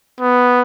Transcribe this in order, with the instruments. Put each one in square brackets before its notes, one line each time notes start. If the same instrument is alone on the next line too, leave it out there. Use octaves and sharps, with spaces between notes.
[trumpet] B3